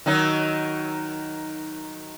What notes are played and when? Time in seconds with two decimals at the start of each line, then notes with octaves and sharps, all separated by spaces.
0.06 D#3 F#3 D#4